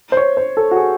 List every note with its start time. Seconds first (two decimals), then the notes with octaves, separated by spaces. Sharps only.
0.12 C5
0.17 C#5
0.37 C5
0.57 A4
0.71 F#4
0.77 G#4